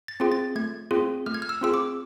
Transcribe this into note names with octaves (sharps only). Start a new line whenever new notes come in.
A6
C4 F4 G#4
A6
A3 G#6
C4 F4 G#4
A3 F6
G#6
F6
E6
C4 F4 G#4 E6
D6